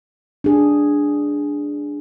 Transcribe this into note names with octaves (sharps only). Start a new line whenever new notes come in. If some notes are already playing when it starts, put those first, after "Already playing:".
D4 G#4